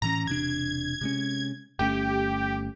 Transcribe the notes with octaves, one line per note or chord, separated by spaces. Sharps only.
A2 E3 C#4 A#5
E1 C3 D4 G#6
C3 G#3 C#4
G1 A3 C#4 G4